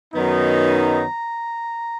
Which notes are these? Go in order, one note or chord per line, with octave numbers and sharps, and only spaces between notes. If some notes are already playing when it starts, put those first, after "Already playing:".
F#2 D#3 F#3 B3 D#4
A#5